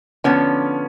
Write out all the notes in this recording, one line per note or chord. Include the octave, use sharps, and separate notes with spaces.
D3 F3 B3 C#4